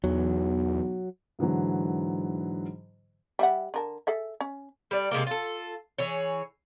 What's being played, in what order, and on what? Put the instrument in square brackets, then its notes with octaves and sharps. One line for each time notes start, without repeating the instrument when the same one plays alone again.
[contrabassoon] B1 [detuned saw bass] E2 [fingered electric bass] F#3
[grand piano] G#2 D3 E3 F#3
[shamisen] G3 E5 F#5
D3 A#4 A5
G#4 A4 E5
C#4
[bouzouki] G3 D5
C3 D#3 G#3 A#3
F4 A4
E3 G#4 C#5